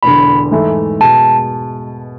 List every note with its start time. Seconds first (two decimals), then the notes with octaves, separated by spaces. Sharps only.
0.03 E1 E2 D3 B5
0.52 G#2 E3 A3 E4 A4
1.00 B2 G#3 A5